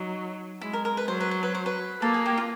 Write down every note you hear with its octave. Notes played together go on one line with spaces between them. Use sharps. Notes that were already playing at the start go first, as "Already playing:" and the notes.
Already playing: F#3 D#4
G#3 E4
A#4
A#4
B4
F#3 C5
B4
C5
B4
C5
B4
A#3 A4
G#4
G4
F4